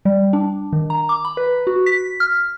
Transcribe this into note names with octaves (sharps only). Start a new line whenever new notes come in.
G3
D4
D#3
A#5
D6
B5
B4
F#4
B6
F6